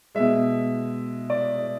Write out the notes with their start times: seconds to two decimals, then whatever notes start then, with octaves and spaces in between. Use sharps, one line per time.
0.15 B2 G#3 E5
1.30 D5